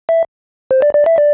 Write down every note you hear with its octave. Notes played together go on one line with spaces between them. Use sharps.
E5
C5
D5
D5
E5
D5